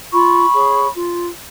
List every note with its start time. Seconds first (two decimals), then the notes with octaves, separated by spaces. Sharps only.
0.12 F4 B5 C#6
0.53 G#4 C#5
0.95 F4